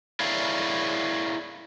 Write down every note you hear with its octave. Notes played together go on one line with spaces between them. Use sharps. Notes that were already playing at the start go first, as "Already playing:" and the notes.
E4 G#4 A#4 C#5 D5 F5